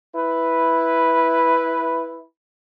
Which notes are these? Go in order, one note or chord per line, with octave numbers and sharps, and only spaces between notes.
E4 B4